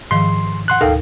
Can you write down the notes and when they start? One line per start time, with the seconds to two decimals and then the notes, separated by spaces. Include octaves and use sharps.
0.11 G#2 D#3 F3 C6
0.68 F#5 C6 F#6
0.81 D2 D#4 A4 A#4 F5 G5